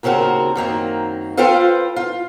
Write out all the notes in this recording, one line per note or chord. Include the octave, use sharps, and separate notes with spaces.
D#2 C#3 C4 F#4 A#4
F#2 D#3 A#3 C4
F4 A4 B4 C5 F5 G5
F4